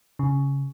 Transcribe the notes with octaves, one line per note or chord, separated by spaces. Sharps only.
C#3